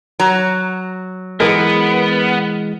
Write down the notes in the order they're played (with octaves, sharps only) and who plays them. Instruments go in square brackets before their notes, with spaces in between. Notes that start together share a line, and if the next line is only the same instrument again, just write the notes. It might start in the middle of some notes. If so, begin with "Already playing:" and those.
[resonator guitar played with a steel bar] F#3 A#5
[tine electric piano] E3 G#3 [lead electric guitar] B3 [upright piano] A#4